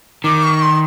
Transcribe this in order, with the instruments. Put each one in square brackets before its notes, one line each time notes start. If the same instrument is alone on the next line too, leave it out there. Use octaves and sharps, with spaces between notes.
[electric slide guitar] D#3 [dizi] D6
[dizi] C#6
C6